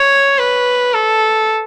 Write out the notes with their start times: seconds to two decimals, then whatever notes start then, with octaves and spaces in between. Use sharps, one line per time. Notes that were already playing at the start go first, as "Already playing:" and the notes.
Already playing: C#5
0.39 B4
0.94 A4